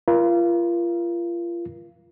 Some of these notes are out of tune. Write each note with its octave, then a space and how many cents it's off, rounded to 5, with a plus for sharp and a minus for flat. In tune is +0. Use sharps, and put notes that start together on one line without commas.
F4 -30 A#4 +35